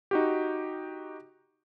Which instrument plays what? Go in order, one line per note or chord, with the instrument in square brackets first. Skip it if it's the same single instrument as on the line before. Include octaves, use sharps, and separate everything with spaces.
[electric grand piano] D#4 F#4 G4